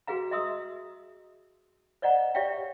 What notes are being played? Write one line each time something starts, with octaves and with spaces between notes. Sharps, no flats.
F#4 G#4 B4 F5 A#5
D#5 E5 C6 D#6 E6
C5 D5 D#5 F#5 A#5
G4 C#5 D5 E5 F5 G5